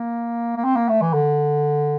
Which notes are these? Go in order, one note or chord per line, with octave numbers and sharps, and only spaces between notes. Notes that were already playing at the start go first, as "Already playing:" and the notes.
Already playing: A#3
A#3
C4
A#3
A3
E3
D3